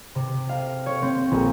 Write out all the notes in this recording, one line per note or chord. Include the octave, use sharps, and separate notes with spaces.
C3
F5
C#5
C4
A#1